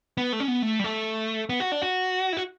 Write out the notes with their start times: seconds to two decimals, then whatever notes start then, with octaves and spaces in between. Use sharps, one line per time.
0.17 B3
0.33 A3
0.40 C#4
0.48 B3
0.62 A3
0.79 G3
0.84 A3
1.49 B3
1.60 F#4
1.72 D4
1.82 F#4
2.33 E4
2.37 F#4